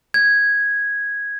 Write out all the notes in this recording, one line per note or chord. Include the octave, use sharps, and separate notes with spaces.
G#6